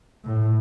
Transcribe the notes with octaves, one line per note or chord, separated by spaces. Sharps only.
A2